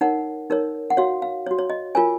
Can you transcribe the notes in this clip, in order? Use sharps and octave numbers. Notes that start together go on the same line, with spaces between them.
D#4 A#4 C#5 F#5
D#4 A#4 C#5
F#5
F#4 C#5 F5
F5
C#5
F#4
C#5
D#5
F4 A#4 C#5 G#5